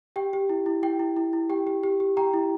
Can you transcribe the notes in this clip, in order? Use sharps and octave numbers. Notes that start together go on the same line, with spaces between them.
G4 G5
G4
E4
E4
E4 G5
E4
E4
E4
G4 G5
G4
G4
G4
G4 G5 A#5
E4